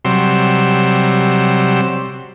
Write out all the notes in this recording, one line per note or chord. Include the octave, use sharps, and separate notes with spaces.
C3 F#3 G3 C6 E6